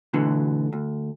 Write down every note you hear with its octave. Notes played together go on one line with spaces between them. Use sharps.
D2 B2 D3 E3
D2